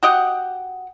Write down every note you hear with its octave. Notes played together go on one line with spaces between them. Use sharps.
F#4 G4 D#5 F#5